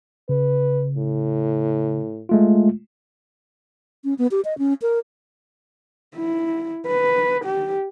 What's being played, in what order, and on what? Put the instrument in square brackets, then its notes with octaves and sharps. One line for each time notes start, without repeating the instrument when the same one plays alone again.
[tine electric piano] C#3 [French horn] B4
[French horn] A2
[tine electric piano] G#3 A3 F4
[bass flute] C#4
B3
G4
D#5
C#4
A#4
[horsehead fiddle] E4
B4
G4